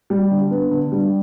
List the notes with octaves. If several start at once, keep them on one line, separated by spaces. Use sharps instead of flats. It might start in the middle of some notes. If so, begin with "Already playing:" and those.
G3
D3
B3
D3
G3